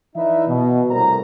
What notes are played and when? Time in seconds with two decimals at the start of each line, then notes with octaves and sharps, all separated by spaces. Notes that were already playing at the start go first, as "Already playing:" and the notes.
0.16 E3 D#4 B4 D5 E5
0.48 B2
0.90 C2 F#2 A2 A#4 C5 A#5